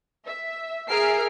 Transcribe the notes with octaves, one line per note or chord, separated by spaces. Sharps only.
E5
G#4 A#4 E5 F6 C7 D7